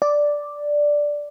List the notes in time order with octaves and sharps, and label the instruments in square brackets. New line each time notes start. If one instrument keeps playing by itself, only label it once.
[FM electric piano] D5